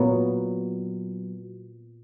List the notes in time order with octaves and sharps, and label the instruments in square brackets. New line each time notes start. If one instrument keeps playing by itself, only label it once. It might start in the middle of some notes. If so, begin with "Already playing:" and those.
Already playing: [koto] A#2 F#3 B3